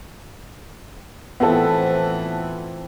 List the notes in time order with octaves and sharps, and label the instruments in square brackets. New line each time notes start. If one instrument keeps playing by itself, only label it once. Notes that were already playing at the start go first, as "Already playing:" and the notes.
[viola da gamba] A2 E3 [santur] F3 C4 E4 [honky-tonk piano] B3 A4